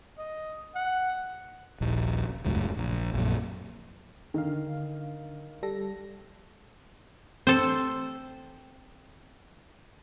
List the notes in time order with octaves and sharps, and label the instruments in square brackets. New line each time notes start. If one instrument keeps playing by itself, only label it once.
[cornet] D#5
F#5
[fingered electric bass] D#1 A#1
E1 C#2 F#2 A2
A#1
A#1 F#2 A#2
[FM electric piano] D3 F5 [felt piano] D#3
[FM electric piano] G3 A4 A#6
[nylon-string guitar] C4 [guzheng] A4 C5